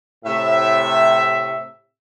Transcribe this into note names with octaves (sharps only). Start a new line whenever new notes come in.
A2 C3 E5